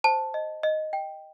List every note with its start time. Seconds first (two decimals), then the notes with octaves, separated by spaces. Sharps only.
0.04 C5 A5
0.34 D#5
0.63 D#5
0.93 G5